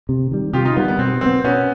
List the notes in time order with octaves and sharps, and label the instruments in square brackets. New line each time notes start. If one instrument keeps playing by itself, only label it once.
[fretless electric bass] C3
D#3 G3
[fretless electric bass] C3 [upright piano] F4 G4
[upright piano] D#4 F4
[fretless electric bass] D#3 G3 [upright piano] B3
[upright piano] B3
[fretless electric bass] B2 [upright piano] C4
[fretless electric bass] F#3 B3 [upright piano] C4
[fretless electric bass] B2 [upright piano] B3 C#4